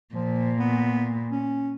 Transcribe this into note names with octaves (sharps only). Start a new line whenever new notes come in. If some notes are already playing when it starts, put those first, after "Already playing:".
A#2 F3
B3
C#4